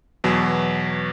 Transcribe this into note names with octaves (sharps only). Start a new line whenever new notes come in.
E2 B2 F#3